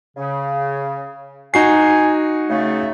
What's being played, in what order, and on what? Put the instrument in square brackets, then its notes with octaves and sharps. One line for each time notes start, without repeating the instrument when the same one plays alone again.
[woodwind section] C#3
[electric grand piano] D#4 F#4 C7 [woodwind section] G#5
[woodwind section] C#3 A3